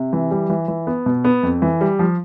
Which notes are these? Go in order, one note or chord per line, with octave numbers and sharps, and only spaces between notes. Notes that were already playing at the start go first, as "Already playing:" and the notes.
Already playing: C3
E3
G3
E3
E3
B3
B2
B3
F2
E3
G3
F3